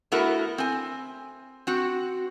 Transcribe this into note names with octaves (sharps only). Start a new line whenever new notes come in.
A3 B3 E4 F#4 A4 A#4
C4 G#5
C4 F#4